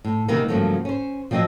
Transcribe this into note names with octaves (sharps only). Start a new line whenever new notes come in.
A2
C3 D#3 E3 G#3 A#3 B3
G2 C#3 F3 F#3 A3 A#3
C#4 C5
F3 F#3 C4 D4 D#5 E5